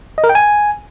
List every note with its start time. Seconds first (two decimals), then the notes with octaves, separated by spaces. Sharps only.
0.18 D#5
0.24 A#4
0.29 G5
0.35 G#5